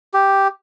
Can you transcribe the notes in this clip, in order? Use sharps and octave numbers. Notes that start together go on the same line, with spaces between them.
G4